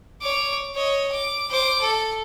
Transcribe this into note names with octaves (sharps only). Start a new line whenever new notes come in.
C#5 D6
C#5 D#5
D6
C5 D6
A4